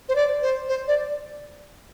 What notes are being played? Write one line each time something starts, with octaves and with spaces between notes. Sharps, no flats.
C5
D5
C5
C5
D5